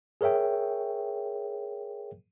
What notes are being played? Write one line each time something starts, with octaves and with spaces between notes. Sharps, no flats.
G#4 A#4 C#5 E5 G5